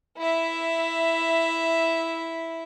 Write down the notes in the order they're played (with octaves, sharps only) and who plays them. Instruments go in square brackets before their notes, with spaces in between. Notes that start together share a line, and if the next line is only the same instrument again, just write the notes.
[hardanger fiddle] E4 E5